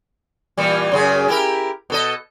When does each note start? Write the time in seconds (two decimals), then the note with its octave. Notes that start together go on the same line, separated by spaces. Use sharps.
0.57 A#2 E3 G3
0.92 F#2 C#3 G#4
1.28 E4 G4 A#4
1.90 B2 A4 D#5